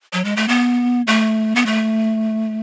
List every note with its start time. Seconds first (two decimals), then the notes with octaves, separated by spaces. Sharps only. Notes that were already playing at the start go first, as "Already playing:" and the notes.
0.13 F#3
0.24 G#3
0.36 A3
0.48 B3
1.07 A3
1.56 B3
1.66 A3